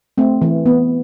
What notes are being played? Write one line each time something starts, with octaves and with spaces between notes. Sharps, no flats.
A3 C4
E3
B3